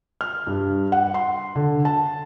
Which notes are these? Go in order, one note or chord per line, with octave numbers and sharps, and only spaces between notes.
F6
G2
F#5
C6
D3
A5